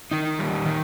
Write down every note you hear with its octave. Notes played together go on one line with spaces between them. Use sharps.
D#3 D#4
G3
D#3